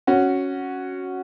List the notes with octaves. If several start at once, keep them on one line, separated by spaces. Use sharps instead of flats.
C#4 F#4